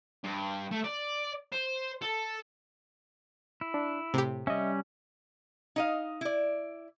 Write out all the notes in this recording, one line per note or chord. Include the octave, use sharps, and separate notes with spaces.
G2
A3
D5
C5
A4
E4
D4
A2 C3 G4
G3 C#4 D#5 E5
D#4 D#5 F5
E4 D5